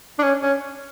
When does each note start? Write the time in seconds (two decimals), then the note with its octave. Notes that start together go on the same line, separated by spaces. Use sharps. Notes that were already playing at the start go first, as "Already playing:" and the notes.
0.19 D4
0.23 C#4
0.43 C#4